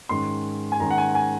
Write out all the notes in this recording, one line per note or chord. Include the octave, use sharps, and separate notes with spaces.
G#2 D#3 G#3 C#4 C6
G#5
G#2 D#3 G#3 C#4 A#5
F#5
G#5
G#5